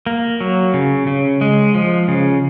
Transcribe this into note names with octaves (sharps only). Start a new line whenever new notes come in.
A#3
F#3
C#3
C#3
G#3
F3
C#3